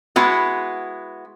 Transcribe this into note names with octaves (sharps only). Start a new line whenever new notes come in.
G#3 B3 E4 F#4